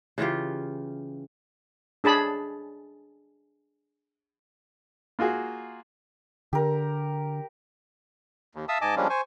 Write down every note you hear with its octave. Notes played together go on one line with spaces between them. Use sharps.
C#3 E3 F4 G4
D4 G#4 A5 B5
A#3 F4 F#4 G#4
D3 G4 A#4
D#2
E5 F5 A5 D#6 E6
G#2 D#5 G#5 A5 D6
F3 G3 G#3 A#3 C#4 D4
C5 G#5 C#6